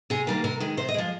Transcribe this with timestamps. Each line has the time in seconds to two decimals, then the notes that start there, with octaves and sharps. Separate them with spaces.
0.10 C3 G#4
0.27 D#3 G3 A#3
0.44 C3 A#4
0.60 D#3 G#3
0.77 C3 C5
0.89 D#5
0.94 F3 G#3